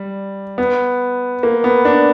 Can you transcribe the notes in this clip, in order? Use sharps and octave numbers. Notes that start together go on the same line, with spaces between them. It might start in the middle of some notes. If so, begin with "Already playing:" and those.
Already playing: G3
B3
A#3
B3
D4